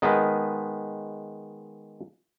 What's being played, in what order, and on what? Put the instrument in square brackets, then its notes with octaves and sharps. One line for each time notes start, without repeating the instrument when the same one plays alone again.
[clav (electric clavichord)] D#3 G#3 B3